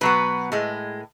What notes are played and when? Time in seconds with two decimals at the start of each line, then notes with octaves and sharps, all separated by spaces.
0.01 B2 F#3 B3 B4
0.52 A2 G#3